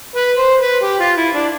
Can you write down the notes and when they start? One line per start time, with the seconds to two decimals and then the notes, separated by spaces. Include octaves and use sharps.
0.16 B4
0.38 C5
0.61 B4
0.83 G4
1.00 F4
1.17 E4
1.35 D4